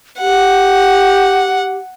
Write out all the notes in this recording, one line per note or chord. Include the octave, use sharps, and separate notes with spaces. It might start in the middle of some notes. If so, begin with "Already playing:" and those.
G4 F#5